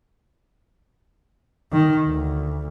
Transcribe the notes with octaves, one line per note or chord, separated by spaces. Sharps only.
D#3
D2